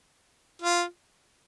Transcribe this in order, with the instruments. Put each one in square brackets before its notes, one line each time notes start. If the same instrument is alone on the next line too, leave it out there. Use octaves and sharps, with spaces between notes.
[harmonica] F4